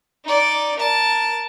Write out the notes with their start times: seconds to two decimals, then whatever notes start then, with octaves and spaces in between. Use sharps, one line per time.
0.25 D#4 D5
0.77 A#4 A5